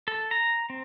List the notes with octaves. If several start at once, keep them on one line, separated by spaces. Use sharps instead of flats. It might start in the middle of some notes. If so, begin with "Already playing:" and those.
A4
A#5
C4